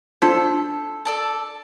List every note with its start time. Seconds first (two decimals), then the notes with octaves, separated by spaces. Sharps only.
0.22 D4 F4 A4 C5
1.05 A4 D5 A5